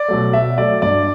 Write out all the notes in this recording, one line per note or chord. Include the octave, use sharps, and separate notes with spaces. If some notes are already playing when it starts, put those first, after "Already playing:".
Already playing: D5
B2 F#3 A3
B2 E5
F#3 A3 D5
G2 D5